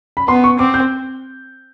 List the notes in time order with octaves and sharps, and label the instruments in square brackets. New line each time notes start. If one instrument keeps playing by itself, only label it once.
[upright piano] B5
[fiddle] B3 [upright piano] C6
[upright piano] C#6
[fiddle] C4 [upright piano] D6
[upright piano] G6